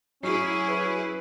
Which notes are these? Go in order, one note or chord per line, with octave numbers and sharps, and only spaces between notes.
F#3 C#4 E4 G#4 C7
B4